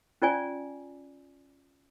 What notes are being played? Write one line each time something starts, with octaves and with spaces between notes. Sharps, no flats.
C#4 F4 D5 G#5